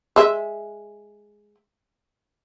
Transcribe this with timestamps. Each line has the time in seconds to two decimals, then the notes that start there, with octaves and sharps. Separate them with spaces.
0.16 G#3 E5